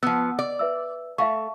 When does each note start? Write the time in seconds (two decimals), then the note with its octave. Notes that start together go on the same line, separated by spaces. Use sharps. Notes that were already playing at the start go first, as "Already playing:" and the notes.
0.03 F3 B3 E6
0.39 D5
0.59 B4 E5 E6
1.18 A3 E5 F5 C#6